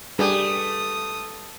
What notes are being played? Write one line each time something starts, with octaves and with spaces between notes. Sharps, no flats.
G3 A3 D4 G4 G#4 B4 D#6